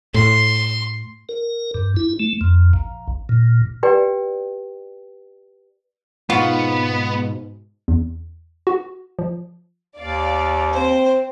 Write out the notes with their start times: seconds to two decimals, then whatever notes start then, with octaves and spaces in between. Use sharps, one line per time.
0.14 A2 C6
1.29 A#4
1.74 G2
1.97 E4
2.20 A3
2.41 F2
2.73 A#1
3.29 A#2
3.83 G4 B4 D5 G5
6.30 G#2 B2 B3 F4 F#4
7.88 E2
8.67 F#4
9.19 F3
9.98 D#2 D5 F5
10.73 C4 C5